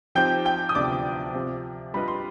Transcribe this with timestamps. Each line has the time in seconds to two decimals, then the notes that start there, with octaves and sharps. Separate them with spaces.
0.15 F3 C4 D#4 G4 C5 G5 G6
0.45 G5 G6
0.69 D#6
0.75 D2 C3 F3 B3 D4 D5 D6
1.34 C3 F3 C4 G4
1.94 G3 D4 F4 B4 D#5 B5
2.08 C6